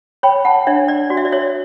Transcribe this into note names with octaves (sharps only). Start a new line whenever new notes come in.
C#5 G5 B5
F#5 A5
D4 C#5 E5
D5
F#4 D5
E5
D5
C#5 E5